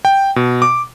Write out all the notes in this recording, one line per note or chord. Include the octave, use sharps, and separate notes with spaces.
G5
B2
D6